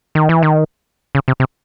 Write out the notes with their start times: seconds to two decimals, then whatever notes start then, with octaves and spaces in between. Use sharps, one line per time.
0.15 D#3
0.29 E3
0.43 D#3
1.15 C#3
1.28 C3
1.40 C3